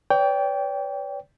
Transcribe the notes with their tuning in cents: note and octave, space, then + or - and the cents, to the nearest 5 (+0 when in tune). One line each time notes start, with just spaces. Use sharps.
B4 +45 D5 -45 G5 +0